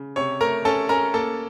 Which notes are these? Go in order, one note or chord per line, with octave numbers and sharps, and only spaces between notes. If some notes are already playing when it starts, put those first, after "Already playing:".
Already playing: C#3
C3 C#5 C#6
A3 A#4 A#5
C#4 A4 A5
C#4 A#4 A#5
A#3 A4 A5